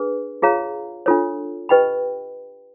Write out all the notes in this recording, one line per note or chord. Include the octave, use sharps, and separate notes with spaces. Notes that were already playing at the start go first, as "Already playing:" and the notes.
Already playing: D4 G#4 B4
F4 G#4 C#5 F5 A#5
D4 F4 A4 C#5
G4 B4 D#5 G5 B5